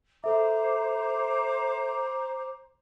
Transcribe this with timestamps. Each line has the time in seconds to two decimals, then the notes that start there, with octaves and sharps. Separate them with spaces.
0.24 A4 C5 E5 A#5 D6